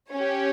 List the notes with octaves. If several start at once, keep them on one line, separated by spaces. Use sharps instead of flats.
C#4 G4 C#5